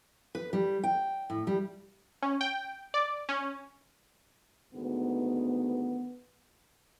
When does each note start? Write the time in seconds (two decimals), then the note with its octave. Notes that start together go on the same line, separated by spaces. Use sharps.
0.35 B4
0.53 G3
0.84 G5
1.30 A2
1.47 G3
2.22 C#4
2.41 G5
2.94 D5
3.29 C#4
4.74 D2 G#2 D#3 B3